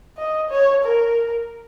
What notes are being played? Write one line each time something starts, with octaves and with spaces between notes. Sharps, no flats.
D#5
C#5
A#4